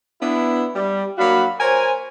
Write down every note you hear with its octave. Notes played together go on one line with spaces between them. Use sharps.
B3 D4 E4
G3
F#3 A#3 D4 F#4 F5 B5
A#4 C5 C#5 G#5